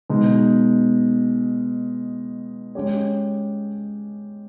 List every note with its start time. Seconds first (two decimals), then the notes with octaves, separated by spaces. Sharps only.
0.10 B2 G#3 D#4
2.75 G#3 C#4 G4 C#5